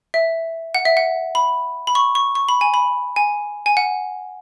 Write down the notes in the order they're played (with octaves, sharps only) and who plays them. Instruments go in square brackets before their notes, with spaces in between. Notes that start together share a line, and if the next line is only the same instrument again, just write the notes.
[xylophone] E5
F#5
E5
F#5
B5
B5
C#6
C#6
C#6
B5
G#5
B5
G#5
G#5
F#5